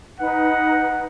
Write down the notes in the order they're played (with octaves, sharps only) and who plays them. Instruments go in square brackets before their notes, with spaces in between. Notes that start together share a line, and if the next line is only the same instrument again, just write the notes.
[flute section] D#4 B4 [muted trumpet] F#5